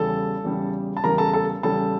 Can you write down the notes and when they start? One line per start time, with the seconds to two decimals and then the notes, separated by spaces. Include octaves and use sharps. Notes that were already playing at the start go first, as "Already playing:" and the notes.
Already playing: E2 C#3 G3 A4 A5
0.44 E2 C#3 G3
0.97 A5
1.03 E2 C#3 G3 A#4 A#5
1.18 A4 A5
1.33 A4 A5
1.63 E2 C#3 G3 A4 A5